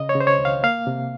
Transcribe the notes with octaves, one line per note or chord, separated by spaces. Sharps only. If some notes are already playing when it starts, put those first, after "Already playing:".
Already playing: C#3 D#5
C#5
C#3
C5
C#5
C#2
F5
A#3 F5
C3